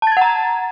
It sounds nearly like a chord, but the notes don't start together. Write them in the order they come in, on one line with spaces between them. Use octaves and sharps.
A5 A6 G#6 F#5 A#5